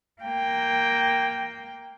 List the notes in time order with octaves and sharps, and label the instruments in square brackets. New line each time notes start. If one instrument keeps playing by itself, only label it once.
[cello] A#3 G5